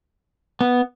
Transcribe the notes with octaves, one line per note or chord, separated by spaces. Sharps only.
B3